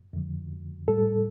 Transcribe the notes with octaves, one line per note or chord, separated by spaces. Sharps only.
F2 D3 F3
A2 G3 A4